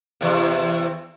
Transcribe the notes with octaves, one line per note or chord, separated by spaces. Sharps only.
E2 C3